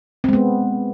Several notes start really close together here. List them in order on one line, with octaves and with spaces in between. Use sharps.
C4 G#3 B3